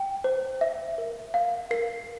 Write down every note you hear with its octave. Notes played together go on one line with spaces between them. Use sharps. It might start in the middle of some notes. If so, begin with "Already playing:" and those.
Already playing: G5
C5
E5
A#4
F5
A#4 C7